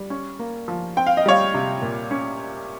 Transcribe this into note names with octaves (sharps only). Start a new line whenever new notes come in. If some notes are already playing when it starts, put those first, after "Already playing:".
Already playing: G3
C#4
A#3
F3
C4 G5
F5
D#5
G3 C#5 F5
C3
A#2
C#4